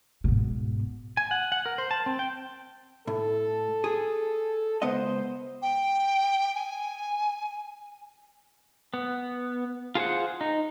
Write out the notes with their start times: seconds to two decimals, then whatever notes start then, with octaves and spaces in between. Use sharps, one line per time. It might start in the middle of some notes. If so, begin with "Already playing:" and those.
0.24 G#2 B2
1.17 G#5
1.31 F#5
1.52 F#5
1.66 A#4
1.78 C5
1.91 A5
2.06 C4
2.19 G5
3.07 A2 A4
3.84 G#4
4.82 C#2 B3 C5 D#5
5.62 G5
6.55 G#5
8.94 B3
9.95 F4 G#4 C5 F#5
10.41 D#4